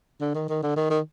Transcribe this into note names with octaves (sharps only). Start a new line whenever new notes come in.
D3
D#3
D#3
D3
D#3
D#3